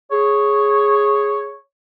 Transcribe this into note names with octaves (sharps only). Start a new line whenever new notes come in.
G#4 C#5